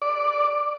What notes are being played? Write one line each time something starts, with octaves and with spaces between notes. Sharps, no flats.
D5